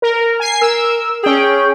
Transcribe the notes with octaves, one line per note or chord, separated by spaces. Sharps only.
A#4
G#5 C7
A#4 E6
C#4 G#4 G5